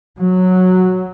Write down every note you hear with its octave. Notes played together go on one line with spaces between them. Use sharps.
F#3